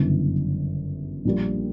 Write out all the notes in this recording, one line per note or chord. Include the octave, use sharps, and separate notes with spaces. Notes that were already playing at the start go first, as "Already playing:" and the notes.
Already playing: G1 F#2 C#3 E3
A#1 A#2 G3 A#3